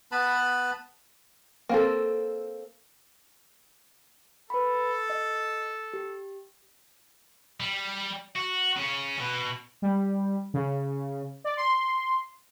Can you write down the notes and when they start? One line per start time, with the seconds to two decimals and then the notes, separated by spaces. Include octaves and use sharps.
0.12 B3 B4 A5 B5
1.69 A#3 C4 A4
4.50 A4 B4 B5
5.10 D#5
5.93 G4
7.60 G3
8.36 F#4
8.76 C#3 C#4
9.18 B2
9.82 G3
10.54 C#3
11.44 D5
11.57 C6